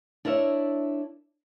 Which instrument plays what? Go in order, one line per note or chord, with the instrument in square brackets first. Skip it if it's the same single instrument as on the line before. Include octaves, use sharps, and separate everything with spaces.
[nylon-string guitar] D4 E4 A#4 C#5 E5